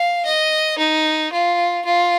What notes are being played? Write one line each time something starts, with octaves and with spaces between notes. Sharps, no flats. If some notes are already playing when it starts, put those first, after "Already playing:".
Already playing: F5
D#5
D#4
F4
F4